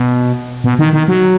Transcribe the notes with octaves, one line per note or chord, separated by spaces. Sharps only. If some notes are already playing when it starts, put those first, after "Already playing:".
Already playing: B2
B2
D#3
D#3
F#3